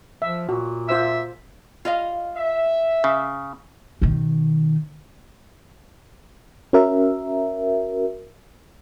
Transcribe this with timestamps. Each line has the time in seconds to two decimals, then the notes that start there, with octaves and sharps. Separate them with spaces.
0.22 F3 E5
0.49 A#2 F#4
0.89 F4 C5 E5 E6
1.85 F4 D#5 F5
2.36 E5
3.04 C#3
4.02 B2 D#3
6.73 C#4 F#4 A#4 E5